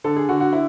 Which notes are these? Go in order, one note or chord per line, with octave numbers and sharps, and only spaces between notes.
D3 A4
G#4
D3 F#4
F#4
E4